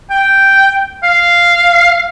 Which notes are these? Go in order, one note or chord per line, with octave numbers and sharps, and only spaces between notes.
G5
F5